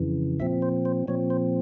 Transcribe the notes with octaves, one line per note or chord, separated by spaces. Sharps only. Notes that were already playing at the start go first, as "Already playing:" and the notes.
Already playing: F2 C#3 E3
A#2 F3 C4 E5
C5
C5
A#2 F3 C4 C#5
C5